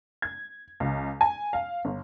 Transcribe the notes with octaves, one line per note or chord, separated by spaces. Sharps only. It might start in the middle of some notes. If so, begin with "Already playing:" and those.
G#6
C#2
G#5
F5
G1